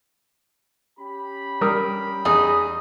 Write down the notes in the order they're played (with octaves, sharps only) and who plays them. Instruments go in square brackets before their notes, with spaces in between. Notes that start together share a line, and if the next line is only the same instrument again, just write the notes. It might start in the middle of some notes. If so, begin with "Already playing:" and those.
[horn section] C#4 G4 B5
[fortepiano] G3 A#4 D#6
[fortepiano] E2 [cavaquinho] D#4 G#4